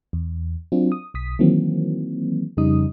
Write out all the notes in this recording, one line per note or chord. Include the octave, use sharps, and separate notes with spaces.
E2
F#3 C4 D4 F4
D#6
B1 D#6 B6
D#3 E3 F#3 A#3 C4
F2 C#3 G3 D#4 D#6